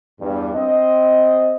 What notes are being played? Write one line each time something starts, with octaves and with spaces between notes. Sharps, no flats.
E2 G2
C4 D#5